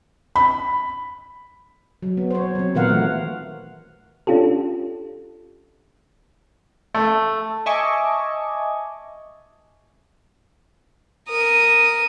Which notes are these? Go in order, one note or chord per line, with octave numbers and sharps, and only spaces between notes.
B5
F#3
B3
C5 C#5
F#3 C4
A#2 D#3 B3 A#4 F5 F#5
E3 A3
C#4 D4 F4 G4 A4
A3
D#5 E5 G#5 A5 C#6 D6
A#4 D#6